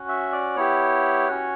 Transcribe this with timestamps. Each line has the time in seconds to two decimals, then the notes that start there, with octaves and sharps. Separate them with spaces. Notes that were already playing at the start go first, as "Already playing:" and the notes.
Already playing: C#4 F#4
0.08 E5
0.32 D5
0.56 B3 E4 G4 C#5
1.28 C#4 F#4